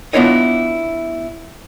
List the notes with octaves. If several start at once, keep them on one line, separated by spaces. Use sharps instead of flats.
B3 D4 E4 F4 C#5 D#5